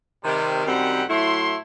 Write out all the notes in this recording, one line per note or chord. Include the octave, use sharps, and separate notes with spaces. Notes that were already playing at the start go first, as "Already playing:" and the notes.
C3 D#3 G3
F#2 D#3 G3 C4 C5 F#5
A2 F#3 A3 E4 C6